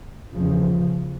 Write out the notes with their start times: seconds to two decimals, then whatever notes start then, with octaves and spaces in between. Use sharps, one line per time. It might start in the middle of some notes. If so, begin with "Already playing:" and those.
0.33 E2 C#3 F3